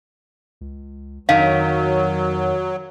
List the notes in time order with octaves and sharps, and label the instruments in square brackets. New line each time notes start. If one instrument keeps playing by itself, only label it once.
[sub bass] C#2
[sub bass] F2 [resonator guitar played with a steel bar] D#3 [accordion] F#3 [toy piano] F5 A#5